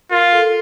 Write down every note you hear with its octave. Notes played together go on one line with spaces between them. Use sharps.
F4 A#4
A4